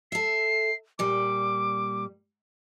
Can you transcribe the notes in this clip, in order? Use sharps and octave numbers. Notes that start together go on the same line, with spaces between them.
A4 E5 C7
A#2 G3 D6